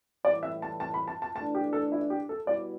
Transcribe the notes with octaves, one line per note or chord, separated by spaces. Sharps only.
A2 E3 G3 E4 D5
E5
A5
A5
B5
A5
A5
E3 A3 D4 A5
G4
A4
E4
G4
A4
B2 G3 E4 D5